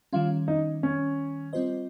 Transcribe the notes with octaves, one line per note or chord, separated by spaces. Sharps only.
D#3 G3 C#4 F4
D#4
C#4
G3 C4 F4 C5 D#5